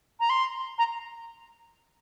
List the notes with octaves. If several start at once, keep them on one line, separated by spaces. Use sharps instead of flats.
A#5
C6
A#5